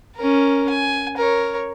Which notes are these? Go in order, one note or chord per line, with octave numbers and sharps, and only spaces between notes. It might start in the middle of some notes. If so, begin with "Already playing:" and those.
C#4 A#4
G#5
A#4 C#5